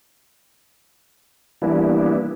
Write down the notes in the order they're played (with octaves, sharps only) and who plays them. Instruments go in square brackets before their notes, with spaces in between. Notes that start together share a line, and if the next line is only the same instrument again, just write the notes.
[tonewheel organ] E3 G3 A#3 B3 D4 E4